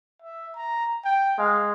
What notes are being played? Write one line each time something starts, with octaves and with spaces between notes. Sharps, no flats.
E5
A#5
G5
G#3 F5